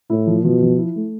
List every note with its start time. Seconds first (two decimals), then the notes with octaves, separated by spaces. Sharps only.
0.10 A2 E4
0.27 F3
0.44 B2 F3
0.62 F3
0.79 E4
0.96 A3